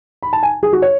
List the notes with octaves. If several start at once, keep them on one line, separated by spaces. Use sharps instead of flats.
B5
A5
G#5
G#4
F#4
C#5